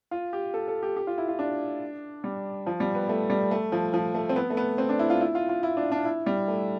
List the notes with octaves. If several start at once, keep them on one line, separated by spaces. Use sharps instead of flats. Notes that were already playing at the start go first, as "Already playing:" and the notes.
F4
G4
A4
A4
G4
G4
F4
E4
F4
D4
G3
F3
G3
B3
A3
G3
A3
F3
F3
A3
C4
B3
A3
B3
C4
D4
E4
F4
E4
F4
F4
E4
D4
D4
E4
G3
A3